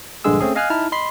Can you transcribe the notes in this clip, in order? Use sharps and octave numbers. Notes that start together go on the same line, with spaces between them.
A#1 G2 D3 G#3 G#4 E6
A3 C4 C#4 G#4
D#5 F5 G#5 F6 F#6
D#4 E4 A5 F6
D#5 B5 C6 C7